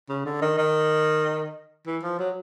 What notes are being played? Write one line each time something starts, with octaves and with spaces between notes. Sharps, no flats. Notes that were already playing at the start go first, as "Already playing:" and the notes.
C#3
D3
D#3
D#3
E3
F3
F#3